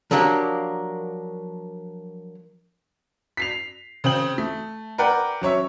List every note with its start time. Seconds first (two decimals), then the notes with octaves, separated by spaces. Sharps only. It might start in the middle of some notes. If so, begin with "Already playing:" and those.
0.11 F3 F#3 A#3 D4 G4
3.37 B6 C7 F7
4.04 C#3 C4 G5 F#7
4.38 A3
4.98 A#4 B4 D5 F#5 G5
5.41 F#3 C#4 C#5 E5